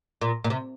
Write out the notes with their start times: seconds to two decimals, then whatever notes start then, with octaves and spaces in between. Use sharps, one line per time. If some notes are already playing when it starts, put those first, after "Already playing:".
0.21 A#2
0.44 A#2
0.50 C3